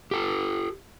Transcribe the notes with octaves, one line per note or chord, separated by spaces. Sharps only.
G4 A4